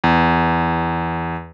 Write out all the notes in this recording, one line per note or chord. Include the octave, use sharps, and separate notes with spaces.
E2